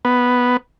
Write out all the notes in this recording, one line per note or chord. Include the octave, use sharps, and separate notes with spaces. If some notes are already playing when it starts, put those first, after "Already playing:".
B3